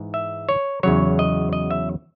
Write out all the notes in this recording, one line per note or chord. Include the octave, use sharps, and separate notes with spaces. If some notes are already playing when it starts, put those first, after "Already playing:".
Already playing: G#2 E3 G#3
E5
C#5
E2 C#3 F#3 C#5
D#5
D#5
E5